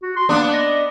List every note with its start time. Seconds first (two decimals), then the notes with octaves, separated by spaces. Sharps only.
0.03 F#4
0.16 C6
0.29 A#3 B3 D4
0.53 D#5